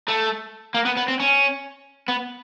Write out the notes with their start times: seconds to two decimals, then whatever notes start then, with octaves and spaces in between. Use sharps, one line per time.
0.08 A3
0.74 A#3
0.85 B3
0.97 B3
1.08 C4
1.20 C#4
2.08 B3